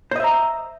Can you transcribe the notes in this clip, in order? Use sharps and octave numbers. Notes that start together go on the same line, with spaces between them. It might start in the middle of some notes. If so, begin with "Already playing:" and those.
C5 D#5 E5 A#5